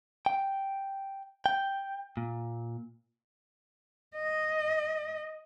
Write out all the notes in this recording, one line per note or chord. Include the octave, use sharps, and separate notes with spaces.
G5
G5
A#2
D#5